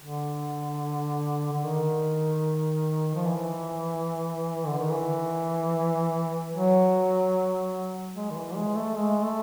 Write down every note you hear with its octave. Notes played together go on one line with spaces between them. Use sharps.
D3
D3
D#3
F3
E3
D3
D#3
E3
F#3
G#3
D#3
E3
G#3
A3
G#3
A3